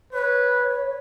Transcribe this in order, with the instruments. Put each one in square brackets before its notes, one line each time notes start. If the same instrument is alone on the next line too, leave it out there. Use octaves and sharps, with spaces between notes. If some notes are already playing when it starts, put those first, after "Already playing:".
[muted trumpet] B4 [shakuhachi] C#5